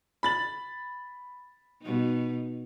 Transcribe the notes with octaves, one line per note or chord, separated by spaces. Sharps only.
B5 A6 F#7
B2 D#4